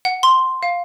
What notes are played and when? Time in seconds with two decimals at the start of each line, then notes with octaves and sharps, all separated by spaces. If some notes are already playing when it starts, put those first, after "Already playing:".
0.05 F#5
0.23 C6
0.63 F5